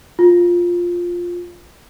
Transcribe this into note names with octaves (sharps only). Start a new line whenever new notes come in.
F4